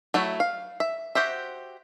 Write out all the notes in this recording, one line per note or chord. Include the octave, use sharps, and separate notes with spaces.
F#3 A3 E4
F5
E5
F#4 G4 C5 E5